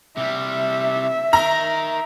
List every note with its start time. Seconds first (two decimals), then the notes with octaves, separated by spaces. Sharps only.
0.17 C3 G3 E5
1.33 D#4 A#4 A#5